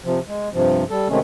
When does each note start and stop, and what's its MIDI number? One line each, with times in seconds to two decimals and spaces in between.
0.04 0.20 48
0.04 0.20 53
0.28 0.49 56
0.53 0.84 43
0.53 0.84 48
0.53 0.84 53
0.90 1.08 55
0.90 1.08 69
1.10 1.19 48
1.10 1.19 51
1.10 1.19 56
1.10 1.19 57
1.10 1.19 61